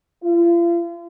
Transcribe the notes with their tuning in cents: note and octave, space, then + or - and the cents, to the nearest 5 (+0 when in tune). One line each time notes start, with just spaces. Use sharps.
F4 -40